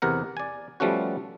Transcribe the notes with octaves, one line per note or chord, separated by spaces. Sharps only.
E2 C3 A#4 F#5
D5 G#5
F3 G3 A3 B3 C#4 F#4